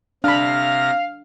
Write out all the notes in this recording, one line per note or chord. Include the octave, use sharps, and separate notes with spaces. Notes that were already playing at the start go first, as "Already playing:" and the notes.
C3 D4 F5 B5 F6 A#6